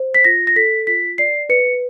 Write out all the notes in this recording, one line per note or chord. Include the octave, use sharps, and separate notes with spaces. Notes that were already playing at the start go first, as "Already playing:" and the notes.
Already playing: C5
B6
F4 A#6
A#6
A4 B6
F4 B6
D5 C7
B4 C#7